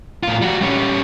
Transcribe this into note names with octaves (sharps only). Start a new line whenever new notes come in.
A2 F4
G3 F#4
G3 C#4